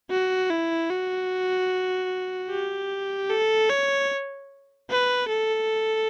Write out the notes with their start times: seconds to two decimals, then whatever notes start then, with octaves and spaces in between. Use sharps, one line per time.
0.11 F#4
0.50 E4
0.91 F#4
2.50 G4
3.30 A4
3.69 C#5
4.90 B4
5.29 A4